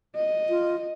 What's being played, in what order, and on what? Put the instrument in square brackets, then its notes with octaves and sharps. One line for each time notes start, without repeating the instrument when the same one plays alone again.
[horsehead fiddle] D#5
[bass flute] F4